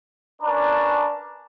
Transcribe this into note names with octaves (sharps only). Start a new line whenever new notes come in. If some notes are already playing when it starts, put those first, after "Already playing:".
C#4 D4 A#4 B4 D5 A5